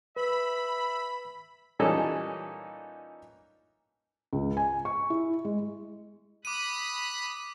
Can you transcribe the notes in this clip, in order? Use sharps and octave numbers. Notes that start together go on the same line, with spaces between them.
B4 E5 B5
A#2 E3 G3 C#4 D#4 A4
C#2
G#5
C#6
E4
G#3
B5 D6 D#6 F#6 D#7